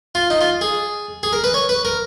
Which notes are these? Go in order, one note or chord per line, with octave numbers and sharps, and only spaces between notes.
F4
D#4
F4
G#4
G#4
A#4
B4
C#5
B4
A#4